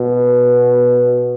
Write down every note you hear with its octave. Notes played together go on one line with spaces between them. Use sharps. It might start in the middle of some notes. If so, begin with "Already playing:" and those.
Already playing: B2